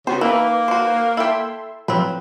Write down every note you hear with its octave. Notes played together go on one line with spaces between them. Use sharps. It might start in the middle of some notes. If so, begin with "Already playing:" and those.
C#3 B3 F#4 C5
E3 A#3 D#4 B4
F#4 C5
E4 A4 E5 G5 C6
A2 F3 F#3 C4 B4